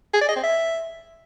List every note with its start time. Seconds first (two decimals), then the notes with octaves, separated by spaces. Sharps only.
0.14 G#4
0.21 D5
0.28 D#5
0.36 C4
0.43 E5